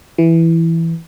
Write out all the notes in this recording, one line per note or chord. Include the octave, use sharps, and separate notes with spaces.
E3